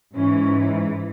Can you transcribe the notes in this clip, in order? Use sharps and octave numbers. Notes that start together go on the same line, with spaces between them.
G#2 E3 C#4